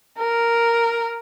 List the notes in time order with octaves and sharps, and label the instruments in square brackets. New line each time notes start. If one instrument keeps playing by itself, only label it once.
[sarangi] A#4